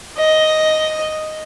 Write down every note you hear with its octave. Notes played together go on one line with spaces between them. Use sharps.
D#5